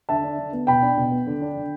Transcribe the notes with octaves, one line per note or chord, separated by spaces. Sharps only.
D3 E5 A5
D4
D3
B3
B2 G5 B5
D4
B2
B3
D3
D4
D3